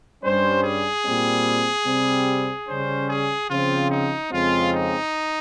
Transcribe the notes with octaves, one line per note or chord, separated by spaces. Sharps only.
G2 G3 C#4 C5
G#4
A#2 G3 C4
C3 G3 C4
C#3 G3 C#4 C5
G#4
C#3 F3 C4 F4
D#4
F2 C#3 G#3 C4 F4
D#4